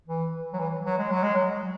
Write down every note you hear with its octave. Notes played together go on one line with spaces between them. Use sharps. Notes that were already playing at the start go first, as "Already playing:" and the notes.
E3
F#3
E3
F#3
G#3
F#3
G#3
F#3